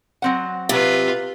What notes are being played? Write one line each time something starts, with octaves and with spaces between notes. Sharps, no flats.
F#3 C4 F#5
C3 F4 B4